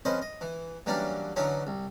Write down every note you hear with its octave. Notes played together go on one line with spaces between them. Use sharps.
F2 C#4 B4 C5 D#5
D#5
E3
E3 F#3 G3 A#3 C#4 D4
D3 E3 F#3 C#4 D#4
C2